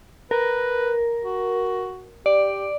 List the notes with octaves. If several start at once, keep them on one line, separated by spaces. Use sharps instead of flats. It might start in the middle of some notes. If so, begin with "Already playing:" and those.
A#4 B4
F#4
G4 D5